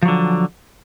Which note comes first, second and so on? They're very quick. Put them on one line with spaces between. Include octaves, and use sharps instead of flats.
F3 F#3 D3